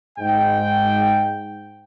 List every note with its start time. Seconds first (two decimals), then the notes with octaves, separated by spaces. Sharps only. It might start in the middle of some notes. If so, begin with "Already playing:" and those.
0.19 G#2 G5